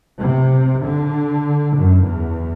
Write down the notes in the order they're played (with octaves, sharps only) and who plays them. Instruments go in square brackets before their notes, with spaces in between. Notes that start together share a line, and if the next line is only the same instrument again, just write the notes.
[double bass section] C3
D3
F#2
E2